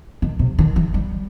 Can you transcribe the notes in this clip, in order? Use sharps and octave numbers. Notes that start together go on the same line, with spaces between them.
D#3
C3
D#3
E3
G3